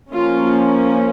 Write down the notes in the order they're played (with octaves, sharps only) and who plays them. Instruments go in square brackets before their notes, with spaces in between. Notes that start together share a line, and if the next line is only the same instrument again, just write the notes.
[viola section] F3 A#3 C#4 F4